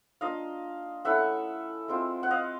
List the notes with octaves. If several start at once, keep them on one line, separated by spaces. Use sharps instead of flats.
A#3 D4 F4 D#5 F5
A3 C#4 E4 E5 F#5
G#3 C4 F4
F#5
D#5 F5